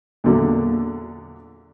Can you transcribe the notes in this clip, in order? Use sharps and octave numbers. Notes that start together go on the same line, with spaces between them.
E2 A#2 D3 F#3